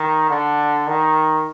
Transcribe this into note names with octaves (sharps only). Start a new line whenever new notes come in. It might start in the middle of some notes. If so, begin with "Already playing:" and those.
Already playing: D#3
D3
D#3